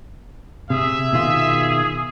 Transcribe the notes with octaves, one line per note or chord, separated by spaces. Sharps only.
C3 G#4 E5
B2 D#3 F4 G#4